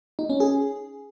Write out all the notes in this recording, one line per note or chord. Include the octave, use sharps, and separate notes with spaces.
D#4
C#4
G#4